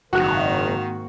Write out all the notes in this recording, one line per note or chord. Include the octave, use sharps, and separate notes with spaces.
F#1 G#2 D#3 A#3 C4 F#4 F#6